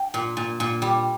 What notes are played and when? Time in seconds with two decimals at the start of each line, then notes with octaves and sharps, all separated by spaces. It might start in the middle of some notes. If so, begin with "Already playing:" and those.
Already playing: G5
0.14 A#2
0.37 A#2
0.60 A#2
0.82 G3